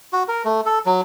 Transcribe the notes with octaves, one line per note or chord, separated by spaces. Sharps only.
F#4
A#4
A3
A4
F#3